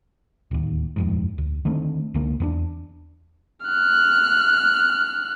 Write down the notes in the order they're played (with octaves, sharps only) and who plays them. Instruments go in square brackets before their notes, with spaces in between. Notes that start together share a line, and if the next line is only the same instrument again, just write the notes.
[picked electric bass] D1 D#2
D#1 F2 G#2
D2
D3 D#3 A3 C4
C#2 D3 A#3
E2 B3 D4
[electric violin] F6 F#6